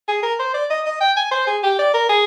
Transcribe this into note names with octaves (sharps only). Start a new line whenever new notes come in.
G#4
A#4
C5
D5
D#5
D#5
G5
G#5
C5
G#4
G4
D5
A#4
G#4